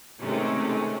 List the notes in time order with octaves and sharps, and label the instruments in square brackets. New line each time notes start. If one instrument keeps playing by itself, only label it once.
[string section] C3 D#3 G#3 A3 C#4